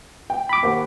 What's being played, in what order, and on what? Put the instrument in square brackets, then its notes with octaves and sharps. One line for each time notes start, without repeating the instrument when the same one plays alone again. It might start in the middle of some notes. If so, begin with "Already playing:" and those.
[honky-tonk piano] G5
[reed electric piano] B5 D6
[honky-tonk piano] D#2 C5 F#5